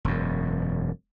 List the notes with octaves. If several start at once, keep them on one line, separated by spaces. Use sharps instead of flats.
E1 F#2